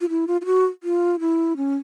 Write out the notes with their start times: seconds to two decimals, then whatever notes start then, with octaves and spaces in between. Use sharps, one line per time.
0.01 F4
0.09 E4
0.27 F4
0.41 F4
0.45 F#4
0.83 F4
1.20 E4
1.57 C#4